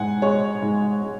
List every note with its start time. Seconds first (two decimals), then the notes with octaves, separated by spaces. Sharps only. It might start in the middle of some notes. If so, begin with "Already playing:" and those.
Already playing: G#2 F#5 G#5
0.22 G#3 C#5
0.62 G#2
1.02 G#3